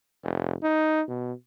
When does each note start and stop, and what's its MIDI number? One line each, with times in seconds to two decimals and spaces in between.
0.24 0.54 29
0.63 1.02 63
1.08 1.33 47